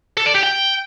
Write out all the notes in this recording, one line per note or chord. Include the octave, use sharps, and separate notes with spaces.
A4
D5
G4
G5